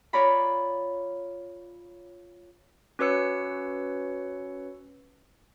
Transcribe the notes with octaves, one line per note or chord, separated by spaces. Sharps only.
F4 C#5 D5 A#5 B5
C#4 F#4 B4 C#5 E6 C#7